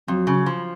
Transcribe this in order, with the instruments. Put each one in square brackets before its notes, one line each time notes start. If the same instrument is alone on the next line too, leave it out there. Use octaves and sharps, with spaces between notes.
[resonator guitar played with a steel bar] F2 [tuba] F#3
[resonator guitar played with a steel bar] C#3
F3